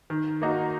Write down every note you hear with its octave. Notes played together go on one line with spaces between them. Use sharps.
D#3
A#3 D#4 F#4